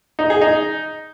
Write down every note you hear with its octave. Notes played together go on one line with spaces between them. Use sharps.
D#4
G#4
D#4